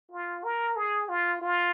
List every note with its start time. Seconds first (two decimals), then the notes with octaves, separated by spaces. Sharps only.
0.11 F4
0.44 A#4
0.76 G#4
1.09 F4
1.42 F4